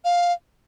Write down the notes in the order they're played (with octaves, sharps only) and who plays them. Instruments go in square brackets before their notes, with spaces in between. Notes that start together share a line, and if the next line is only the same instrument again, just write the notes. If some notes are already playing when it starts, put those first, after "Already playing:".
[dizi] F5